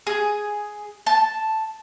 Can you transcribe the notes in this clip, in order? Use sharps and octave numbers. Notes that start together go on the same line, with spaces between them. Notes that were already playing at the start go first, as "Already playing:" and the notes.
G#4
A5